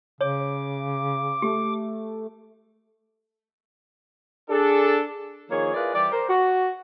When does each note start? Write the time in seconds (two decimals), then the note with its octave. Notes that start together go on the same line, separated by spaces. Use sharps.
0.21 C#3 C#5 D6
1.42 A3 G4
4.50 D4 G#4 A4
5.50 D#3 F3 A#3 G#4 C#5
5.74 E4 F4 G#4 A#4 B4 D5
5.94 E3 G3 G4 D5
6.12 A#4 C5
6.29 F#4